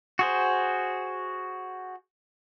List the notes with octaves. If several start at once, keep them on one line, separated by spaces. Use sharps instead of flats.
F#4 G#4 C5